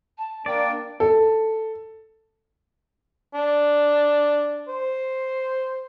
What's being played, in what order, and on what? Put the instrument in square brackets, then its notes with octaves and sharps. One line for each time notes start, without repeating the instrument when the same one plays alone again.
[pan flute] A5
[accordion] A#3 D4 [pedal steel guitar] D5 [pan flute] G5
[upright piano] A4
[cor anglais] D4
C5